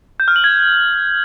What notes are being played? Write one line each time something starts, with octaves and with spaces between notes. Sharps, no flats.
G6
F6
F#7
G#6